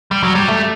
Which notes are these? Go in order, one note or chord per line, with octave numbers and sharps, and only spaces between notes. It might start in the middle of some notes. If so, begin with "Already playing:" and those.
G3
F#3
G3
A3